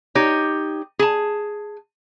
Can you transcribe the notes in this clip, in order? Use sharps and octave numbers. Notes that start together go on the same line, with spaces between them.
D#4 G4 C#5
G#4 A5